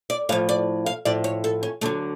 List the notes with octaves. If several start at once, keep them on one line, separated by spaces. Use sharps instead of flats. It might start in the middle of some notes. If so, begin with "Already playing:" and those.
D5
A2 F3 F5
D5
F5
A2 F3 D5
C#5
A4
C#4
D2 D3 F#3 A3